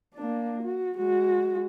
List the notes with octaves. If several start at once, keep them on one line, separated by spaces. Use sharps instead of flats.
A#3 D4
F#4
G#3 F#4